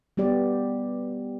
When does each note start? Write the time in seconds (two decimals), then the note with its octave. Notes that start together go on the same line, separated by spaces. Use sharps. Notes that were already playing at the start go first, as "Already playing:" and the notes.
0.17 G3 B3 G4 D5